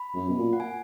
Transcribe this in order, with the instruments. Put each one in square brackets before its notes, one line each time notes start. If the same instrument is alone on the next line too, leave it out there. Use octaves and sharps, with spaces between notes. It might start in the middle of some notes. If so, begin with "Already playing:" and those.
Already playing: [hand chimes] B5
[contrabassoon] F#2
B2
A#2
[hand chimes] F#5
G#5